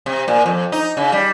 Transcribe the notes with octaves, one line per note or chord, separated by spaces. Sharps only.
C3
A#2
F2
D#4
C#3
G3